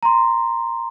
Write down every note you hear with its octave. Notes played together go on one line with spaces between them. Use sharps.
A#5 C6